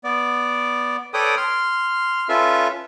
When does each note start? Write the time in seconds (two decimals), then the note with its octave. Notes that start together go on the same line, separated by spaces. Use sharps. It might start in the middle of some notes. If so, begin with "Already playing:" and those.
0.04 B3 D5
1.14 A4 B4 C#5 D5 G5 D#6
1.37 C6 F6
2.29 C#4 F4 A4 B4 E5